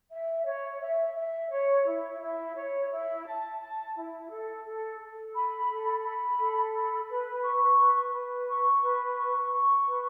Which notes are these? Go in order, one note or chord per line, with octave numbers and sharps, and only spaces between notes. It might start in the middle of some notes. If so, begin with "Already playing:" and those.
E5
C#5
E5
E5
C#5
E4
E4
C#5
E4
A5
A5
E4
A4
A4
A4
B5
A4
B5
A4
B5
B4
C#6
B4
B4
C#6
B4
C#6
C#6
B4